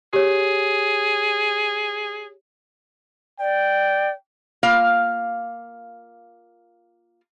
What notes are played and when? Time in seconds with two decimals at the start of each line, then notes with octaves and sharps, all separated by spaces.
0.13 G4 G#4 C#5
3.40 D5 G5
4.63 A#3 F4 F5